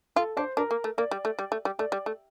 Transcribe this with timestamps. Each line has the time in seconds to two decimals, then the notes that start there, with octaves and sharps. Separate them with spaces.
0.16 F4 A4
0.37 D4 C5
0.57 D4 A#4
0.71 A#3
0.84 A3
0.98 A#3 D5
1.11 G3
1.25 A3
1.39 G3
1.52 A3
1.65 G3
1.79 A3 D5
1.92 G3
2.06 A3